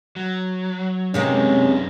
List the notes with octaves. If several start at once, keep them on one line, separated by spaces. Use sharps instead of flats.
F#3
F#2 C3 G#3 A#3 C#4 D#4 B4